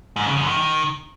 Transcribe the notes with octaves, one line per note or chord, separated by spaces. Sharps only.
G#2
C#3
F#2
D#3
D#3